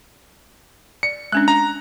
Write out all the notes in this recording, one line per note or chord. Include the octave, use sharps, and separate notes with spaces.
D5 C#7
G#3 C#4 D4 F#6
A#5